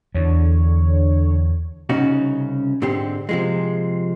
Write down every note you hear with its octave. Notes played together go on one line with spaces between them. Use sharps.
E2 D3 C#5
C2 C#3 C#4 D#4 F#4
G#2 D3 C4 G4
C3 F3 G#3